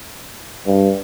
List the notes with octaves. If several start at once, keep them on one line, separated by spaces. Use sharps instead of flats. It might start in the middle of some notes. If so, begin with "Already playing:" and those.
G2